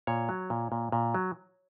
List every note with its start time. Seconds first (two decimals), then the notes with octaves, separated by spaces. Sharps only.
0.07 A#2 C#5
0.29 F#3
0.50 A#2
0.72 A#2
0.92 A#2
1.14 F#3